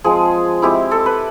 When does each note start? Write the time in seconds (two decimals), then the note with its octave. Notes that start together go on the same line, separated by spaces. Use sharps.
0.04 F3 G#3 C4 G#4
0.62 G#3 C4 E4 G4
0.91 A4
1.06 B4